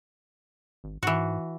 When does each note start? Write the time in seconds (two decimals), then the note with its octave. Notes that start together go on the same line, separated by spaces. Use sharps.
0.84 G#1
1.03 G#2 E3 F#4